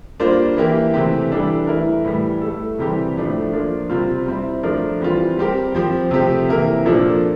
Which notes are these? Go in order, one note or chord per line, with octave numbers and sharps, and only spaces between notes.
G3 A#3 D4 F4 C5
E3 A#3 E4 G4
C3 E3 A3 C4 G4
E3 G3 D4 A4
E3 A3 E4 A#4
A2 E3 G3
A3 E4 A4
C3 E3 G3 C4 G4
A2 F3 A3 D4
F3 A#3 D4 F4
C3 G3 C4 F4
G3 C4 E4
F3 A3 D4 F4 A#4
E3 G3 C4 F4
G3 C4 G4 A#4
F3 C4 G4
C3 F3 A3 C4 G4
C3 E3 A#3 E4 A#4
A#2 F3 A#3 D4 A4